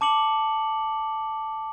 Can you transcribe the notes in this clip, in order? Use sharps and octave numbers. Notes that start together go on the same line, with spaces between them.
A5 D6 C#7 F#7